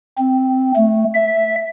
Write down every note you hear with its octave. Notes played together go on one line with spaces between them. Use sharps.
C4
A3
E5